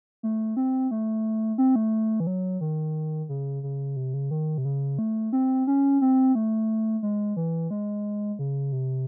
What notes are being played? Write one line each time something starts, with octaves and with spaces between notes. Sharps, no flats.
A3
C4
A3
C4
A3
E3
F#3
D#3
C#3
C#3
C3
C#3
D#3
C3
C#3
A3
C4
C#4
C4
A3
G#3
E3
G#3
C#3
C3